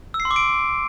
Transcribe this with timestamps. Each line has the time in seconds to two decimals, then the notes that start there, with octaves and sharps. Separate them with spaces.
0.14 E6
0.20 C7
0.25 C6
0.31 D6
0.36 D7